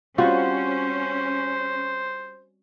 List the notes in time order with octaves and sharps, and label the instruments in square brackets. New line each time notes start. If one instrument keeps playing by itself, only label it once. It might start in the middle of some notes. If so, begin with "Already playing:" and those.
[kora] G3 C4 F#4 [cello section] C#4 [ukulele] F4 [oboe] C5